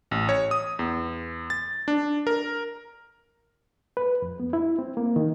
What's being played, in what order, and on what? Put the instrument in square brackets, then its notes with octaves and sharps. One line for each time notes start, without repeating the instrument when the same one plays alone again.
[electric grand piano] A1
C#5
D#6
E2
A6
D4
A#4
[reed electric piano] B4
F2
B3
E4
C4
A#3
D#3